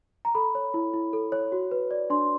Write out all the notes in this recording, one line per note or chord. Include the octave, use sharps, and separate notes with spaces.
A#5
A4 B5
C#5
E4
E4
A4
C#5
F#4
B4
D5
D4 C6